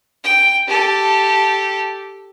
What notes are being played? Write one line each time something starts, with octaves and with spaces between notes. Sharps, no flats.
G5
G4 A4